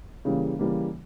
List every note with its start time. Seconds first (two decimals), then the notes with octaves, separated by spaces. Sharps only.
0.25 C#3 E3 G3 A#3
0.59 C#3 E3 G3 A#3